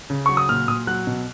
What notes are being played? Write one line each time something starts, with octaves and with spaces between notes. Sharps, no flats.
C#3
F#3 C#6
D#6
A#2 F6
A#2 D#6
F#3 F#6
B2